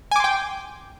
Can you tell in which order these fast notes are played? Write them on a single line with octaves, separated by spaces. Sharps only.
G#5 D6 C6 G5